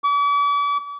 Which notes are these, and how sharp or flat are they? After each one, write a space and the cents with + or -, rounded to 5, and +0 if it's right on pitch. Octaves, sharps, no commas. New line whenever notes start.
D6 -45